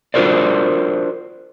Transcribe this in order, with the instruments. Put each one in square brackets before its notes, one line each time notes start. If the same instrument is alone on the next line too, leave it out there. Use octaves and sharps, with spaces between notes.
[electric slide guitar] D4 F4 F#4 A#4 C5 D5